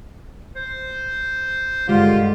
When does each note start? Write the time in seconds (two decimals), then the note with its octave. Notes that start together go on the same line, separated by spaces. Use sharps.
0.56 C5
1.89 G2 D3 G#3 F4 G4